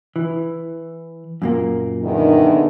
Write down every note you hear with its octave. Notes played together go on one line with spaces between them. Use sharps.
E3
F#2 A#2 A#3
E2 D3 D#3